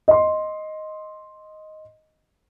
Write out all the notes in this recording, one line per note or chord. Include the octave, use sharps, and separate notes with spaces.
D#5 C6